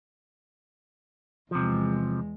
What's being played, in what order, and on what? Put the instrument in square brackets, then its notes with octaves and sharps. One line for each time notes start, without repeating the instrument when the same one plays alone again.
[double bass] E2 G#3 [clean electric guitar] C3 F3